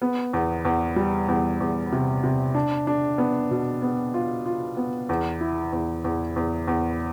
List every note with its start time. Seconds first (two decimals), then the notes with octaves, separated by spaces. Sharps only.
0.02 B3
0.33 E2
0.65 E2
0.96 G3
1.28 E2
1.60 E2
1.92 C3
2.23 C3
2.55 D4
2.87 D4
3.18 B3
3.51 B2
3.82 B3
4.14 F4
4.46 F4
4.77 B3
5.09 E2
5.41 E4
5.73 E2
6.04 E2
6.36 E2
6.68 E2